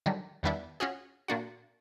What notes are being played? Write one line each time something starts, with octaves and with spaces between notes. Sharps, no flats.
D3 D#3 F#3 G3
E2 D#3 G3 B3 D4 E4
C#4 F4 F#4 G#4
A#2 A#3 D4 F#4